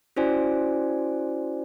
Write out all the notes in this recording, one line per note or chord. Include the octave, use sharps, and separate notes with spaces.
C#4 E4 F#4 C5 D5 G#5